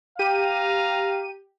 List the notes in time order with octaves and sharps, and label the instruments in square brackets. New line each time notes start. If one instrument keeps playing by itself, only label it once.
[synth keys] G4 D#7 [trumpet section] F5 A#5